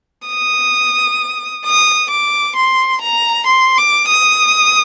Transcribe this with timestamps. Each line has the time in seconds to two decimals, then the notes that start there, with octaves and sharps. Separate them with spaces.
0.28 D#6
1.65 D#6
2.11 D6
2.56 C6
3.01 A#5
3.47 C6
3.78 D6
4.08 D#6